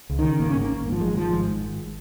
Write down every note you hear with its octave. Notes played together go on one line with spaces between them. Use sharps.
C#2
D#3
C#3
G#1 A#3
G#2 C#4
A#3
G#1
G#2
F3
G#1 G#3
G#2 F3
G#1 G#3
G#2
G#1